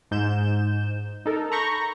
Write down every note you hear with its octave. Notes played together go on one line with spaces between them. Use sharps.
G#2 G6 E7
D#4 A4 A#4
A#5 B5 C#6 G6 A#6